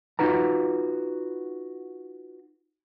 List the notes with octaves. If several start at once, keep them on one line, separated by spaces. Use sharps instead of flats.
D#4 F4 F#4 B4 A#5